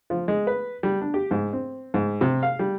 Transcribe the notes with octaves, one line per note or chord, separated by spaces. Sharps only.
F3
G#3
B4
G3
D4
G4
G#2
C4
G#2
C3
F5
G3